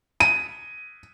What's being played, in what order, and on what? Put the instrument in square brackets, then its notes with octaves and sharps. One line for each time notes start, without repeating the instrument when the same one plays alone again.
[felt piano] D#7